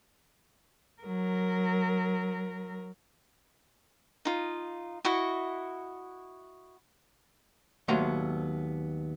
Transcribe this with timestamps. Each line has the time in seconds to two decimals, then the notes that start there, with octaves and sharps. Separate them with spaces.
1.02 F#3 A#4
4.25 D#4 F4
5.05 E4 F#4 D#5 F#5
7.88 D#2 F#3 A3 B3 A#5 C6